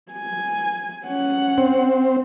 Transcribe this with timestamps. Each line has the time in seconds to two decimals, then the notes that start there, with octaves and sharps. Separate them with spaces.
0.12 G#5
1.05 C#4 F#5
1.58 C4